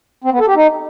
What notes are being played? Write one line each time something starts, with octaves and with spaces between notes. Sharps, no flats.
C4
B3
A4
G4
D#4